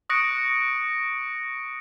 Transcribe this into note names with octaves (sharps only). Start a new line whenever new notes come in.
C#6 D#6 F#6 A#6 C#7 D7